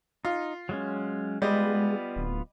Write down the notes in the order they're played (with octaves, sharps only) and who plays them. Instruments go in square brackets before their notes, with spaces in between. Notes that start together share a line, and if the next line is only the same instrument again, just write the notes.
[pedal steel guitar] D#4 [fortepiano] F4
[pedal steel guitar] F#3 G#3 C#4
[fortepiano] G3 D#5 [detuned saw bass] G#3 [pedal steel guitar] B3 F4 B4
[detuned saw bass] D1